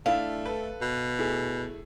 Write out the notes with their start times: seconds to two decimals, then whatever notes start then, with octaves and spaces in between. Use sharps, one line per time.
0.06 A3 D4 E4 F5
0.46 A4 B4
0.81 B2
1.18 A3 E4 G#4